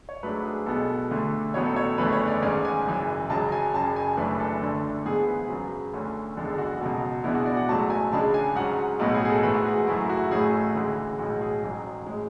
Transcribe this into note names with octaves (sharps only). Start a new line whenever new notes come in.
C#5
G#2 F#3 A3 D4 B4
G#4
B1 B2 G#3 B3 A4
D2 D3 A3 D4
A1 A2 F#3 B3 C#5
A4
C#5
F#1 E2 D3 A3 B4
C#5
D5
G#1 G#2 G#3 C#4 D5
G#5
F#1 F#2 E3
C#2 C#3 F#3 A5
G#5
F#1 F#2 C#3 A5
G#5
F#1 F#2 E3 A3 D4 B4
A4
D2 D3 A3 D4
G#2 E3 B3 G#4
B4
F#2 C#3 F#3
D2 D3 A3 C#4
F#1 E2 D3 G#3 A4
F#4
C#2 B2 F#3 F#4
E2 B2 G#3 B3 D4 E4
F#4
D5
F#5
A1 G#2 F#3 A3 A5
G#5
C#2 C#3 G#3 D4 A5
G#5
G#2 F#3 C#4 F#5
B1 A2 G#3 B3 F#4
G#4
G#4
A4
G#2 E3 A3 B4
F#4
G#4
F#2 C#3 F#3 A3 E4
F#4
A1 A2 F#3 A3 G#4
F#4
D2 C#3 E3 G#3
B1 A2 G#3 F#4
G#4
A1 G#2 F#3
A2 G#3